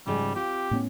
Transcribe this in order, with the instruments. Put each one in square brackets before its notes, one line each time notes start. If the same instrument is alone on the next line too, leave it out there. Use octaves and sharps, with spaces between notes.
[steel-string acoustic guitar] G#2 C#3 F3 [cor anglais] G3
[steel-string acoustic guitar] C4 F4 [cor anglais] G4
[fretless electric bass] A2 B3 C#4